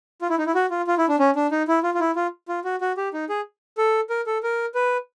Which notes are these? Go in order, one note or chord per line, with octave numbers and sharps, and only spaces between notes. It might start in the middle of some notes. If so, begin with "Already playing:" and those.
F4
E4
D#4
E4
F#4
F4
F4
E4
D4
C#4
D4
D#4
E4
F4
F4
E4
F4
F4
F#4
F#4
G4
D#4
G#4
A4
A#4
A4
A#4
B4